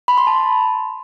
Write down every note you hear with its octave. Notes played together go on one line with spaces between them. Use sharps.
B5
C6
A5